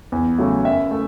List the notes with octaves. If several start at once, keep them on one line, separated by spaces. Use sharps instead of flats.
E2
C#3 F#3 A3
F#2 E5
A3